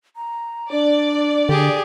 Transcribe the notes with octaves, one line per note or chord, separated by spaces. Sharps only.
A#5
D4 D5
D3 G4 G#4